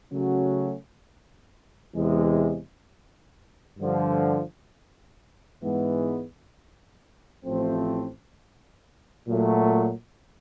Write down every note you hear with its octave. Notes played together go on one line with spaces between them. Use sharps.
C#3 F#3 A3 C#4 F#4
E2 C3 E3 G#3
G2 D3 F3
G#2 E3 G#3 B3
A1 A2 F3 A3 C4
A#2 F#3 A3